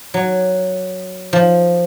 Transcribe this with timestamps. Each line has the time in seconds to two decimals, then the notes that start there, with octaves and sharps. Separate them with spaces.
0.14 F#3
1.33 F3